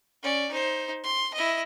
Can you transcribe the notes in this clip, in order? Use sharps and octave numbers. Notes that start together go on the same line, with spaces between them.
C#4 D5
D#4 C5
C6
E4 D#5